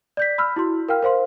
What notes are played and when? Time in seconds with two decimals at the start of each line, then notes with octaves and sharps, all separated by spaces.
0.17 D5 G6 B6
0.38 B5 E6 F6
0.56 E4 F#4 C6
0.89 A#4 F5 G5 F6
1.03 A#4 C5 F5 C6